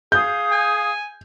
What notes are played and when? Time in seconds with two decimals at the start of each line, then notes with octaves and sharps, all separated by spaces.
0.12 G#4 F5 D#6 G6
0.52 G#5